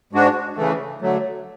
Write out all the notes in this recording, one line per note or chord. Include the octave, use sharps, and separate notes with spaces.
G#2 G#3 D4 F#4
C#3 E3 A3
D3 F#3 A3